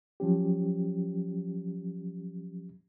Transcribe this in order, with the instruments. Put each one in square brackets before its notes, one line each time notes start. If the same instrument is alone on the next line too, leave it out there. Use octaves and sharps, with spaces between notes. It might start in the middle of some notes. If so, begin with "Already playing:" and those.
[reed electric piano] F3 F#3 C#4 G4